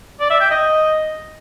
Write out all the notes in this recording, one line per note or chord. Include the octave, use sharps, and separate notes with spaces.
D5
E5
G5
D#5